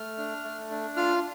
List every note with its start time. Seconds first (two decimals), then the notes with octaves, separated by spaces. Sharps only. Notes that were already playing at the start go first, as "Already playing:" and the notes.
Already playing: A3 F6
0.18 D4
0.44 A3
0.70 D4
0.97 F4 F6